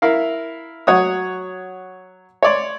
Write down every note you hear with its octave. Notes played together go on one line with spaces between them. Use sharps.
E4 A#4 F5
F#3 C#5 F#5 D#6
C#5 D5 C6